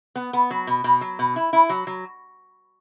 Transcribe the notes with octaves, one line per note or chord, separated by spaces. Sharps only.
B3
B3
F#3
B2
B2
F#3
B2
E4
E4
F#3
F#3